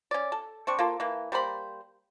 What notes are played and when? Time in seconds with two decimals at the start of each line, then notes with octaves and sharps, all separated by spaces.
0.11 C#4 D5
0.32 A4
0.67 C4 D4 C#6
0.79 A#3 F4 A4
1.00 E3 A#3
1.32 G3 A#3 C5 B5